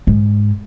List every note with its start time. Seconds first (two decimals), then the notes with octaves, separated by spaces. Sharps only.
0.07 G#2